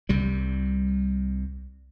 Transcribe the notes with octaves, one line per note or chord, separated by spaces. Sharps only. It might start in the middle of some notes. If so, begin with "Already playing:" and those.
C2 C3 G3